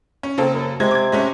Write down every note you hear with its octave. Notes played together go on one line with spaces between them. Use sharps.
C#4
C#3 A#3 C4 A4
F#2
C3 G#3 G#6
D6 G#6
G#3 A3 C#4